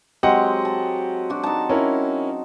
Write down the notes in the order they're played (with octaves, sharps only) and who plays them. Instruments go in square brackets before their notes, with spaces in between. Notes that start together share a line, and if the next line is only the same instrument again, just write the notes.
[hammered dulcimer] F#3 G#3 C4 [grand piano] G4 D#5 F#5
[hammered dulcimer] A5
D4 F#4
D#4 A5
[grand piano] C#4 E4 A#4